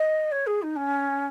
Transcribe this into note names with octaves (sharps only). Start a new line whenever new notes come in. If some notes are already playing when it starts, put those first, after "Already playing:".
Already playing: D#5
C#5
G#4
D#4
C#4